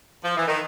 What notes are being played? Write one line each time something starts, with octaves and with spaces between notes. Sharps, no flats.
F3
E3
D#3